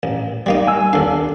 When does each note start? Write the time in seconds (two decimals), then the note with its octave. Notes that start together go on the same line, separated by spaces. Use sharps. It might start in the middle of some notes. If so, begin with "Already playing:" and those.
0.03 A1
0.46 G3 A#3 D#4
0.67 G#5 E6
0.93 D#2 D4 A4 F5